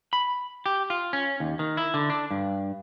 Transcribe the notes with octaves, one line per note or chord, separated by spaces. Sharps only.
B5
G4
F4
C#4
D#2
D#3
E4
D3
D4
G2